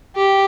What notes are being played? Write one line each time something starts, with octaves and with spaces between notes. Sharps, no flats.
G4